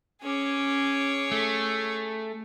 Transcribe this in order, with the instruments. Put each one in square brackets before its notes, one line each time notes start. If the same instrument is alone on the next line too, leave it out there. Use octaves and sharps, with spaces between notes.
[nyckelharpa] C#4 D6 [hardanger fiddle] G#4 C#5
[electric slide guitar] A3